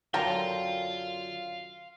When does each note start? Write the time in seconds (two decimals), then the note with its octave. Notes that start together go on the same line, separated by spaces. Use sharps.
0.14 F#2 D3 F4 A#4 F5 G5 A5 C6